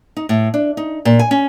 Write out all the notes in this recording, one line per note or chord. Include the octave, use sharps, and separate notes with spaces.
D#4
A2
D4
D#4
A#2
G#5
C#4